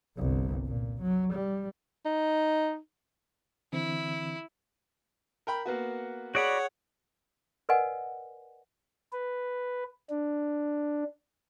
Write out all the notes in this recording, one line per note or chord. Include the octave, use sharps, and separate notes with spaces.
G1 C2
A#2
F#3
G3
D#4
D3 E3 C4 E4
A#4 G5 B5
A#3 B3 F#4
F#4 G#4 C#5 D5 F#5 B5
A#4 B4 D5 D#5 F#5 G#5
B4
D4